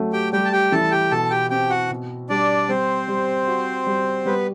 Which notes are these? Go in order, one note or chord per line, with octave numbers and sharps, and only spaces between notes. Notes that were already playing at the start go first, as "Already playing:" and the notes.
Already playing: F#3 A3
G4 G5
G3 G4 G5
A5
G4 G5
E3 A4 A5
G4 G5
B2 A4 A5
G4 G5
C4 G4 G5
F#4 F#5
B2
G3 D4 D5
G3 C4 C5
G3
F#4
G3
G3 B3 B4